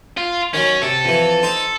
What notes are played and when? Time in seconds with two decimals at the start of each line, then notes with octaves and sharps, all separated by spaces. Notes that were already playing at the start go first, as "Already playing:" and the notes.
0.17 F4
0.54 D#3 F#3 C#4
0.82 C3 A4
1.04 F2 E3
1.43 D#4 C5